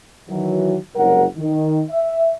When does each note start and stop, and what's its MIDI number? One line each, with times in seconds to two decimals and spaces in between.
0.29 0.76 51
0.29 0.76 52
0.29 0.76 54
0.96 1.24 30
0.96 1.24 36
0.96 1.24 44
0.96 1.24 54
0.96 1.24 70
0.96 1.24 78
1.37 1.82 51
1.90 2.34 76